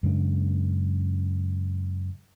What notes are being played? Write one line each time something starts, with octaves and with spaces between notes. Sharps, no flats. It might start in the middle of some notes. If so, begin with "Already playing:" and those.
F#2 C#3 G#3 D4